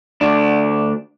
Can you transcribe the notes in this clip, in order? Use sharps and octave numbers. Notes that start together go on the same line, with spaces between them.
D2 D4